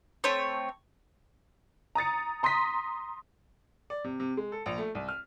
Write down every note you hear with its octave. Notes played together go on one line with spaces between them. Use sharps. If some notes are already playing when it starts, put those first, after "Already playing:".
A3 C4 C#5
A#5 D#6 A6 C#7
A#5 C6 D#6 A#6 B6
D5
C3
C3
G#3
A4
A#1
A3
C2
F6